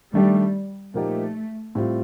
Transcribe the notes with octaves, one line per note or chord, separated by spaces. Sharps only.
D#3 G3 A3 D4 G4
A#2 F3 A3 A#3 D#4 G4
A2 G3 C4 F4